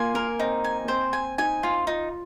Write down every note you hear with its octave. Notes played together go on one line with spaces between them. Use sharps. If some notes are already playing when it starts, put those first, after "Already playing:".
Already playing: A#3 F4 G#5
A#3 A#4
C4 D#4
G#5
A#3
C4 C5
G#5
D#4 G#5
F4
D#4 F4